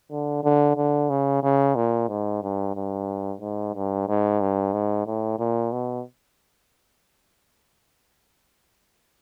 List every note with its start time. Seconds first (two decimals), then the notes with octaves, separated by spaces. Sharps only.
0.11 D3
0.44 D3
0.77 D3
1.10 C#3
1.43 C#3
1.76 A#2
2.09 G#2
2.43 G2
2.75 G2
3.41 G#2
3.75 G2
4.08 G#2
4.41 G2
4.73 G#2
5.07 A2
5.39 A#2
5.72 B2